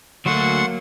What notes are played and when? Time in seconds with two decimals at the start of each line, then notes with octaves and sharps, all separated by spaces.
0.26 D2 F#3 A3 A#3 F#5 C6 C#6